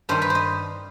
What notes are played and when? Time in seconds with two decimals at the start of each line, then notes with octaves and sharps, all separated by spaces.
0.09 G2 D#3 G3 D#4 C5
0.22 B4
0.30 C5 D#5